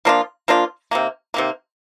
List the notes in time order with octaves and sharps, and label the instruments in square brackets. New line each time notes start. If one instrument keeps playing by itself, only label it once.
[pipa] F3 A#3 D4 F4
F3 A#3 D4 F4
C3 D#3 A#3
C3 D#3 A#3